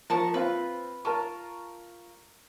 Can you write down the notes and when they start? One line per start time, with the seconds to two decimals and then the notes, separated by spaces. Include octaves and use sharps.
0.10 F3 A#4 A5 C#6
0.34 C4 F4 B4
1.05 F4 A#4 A5 C#6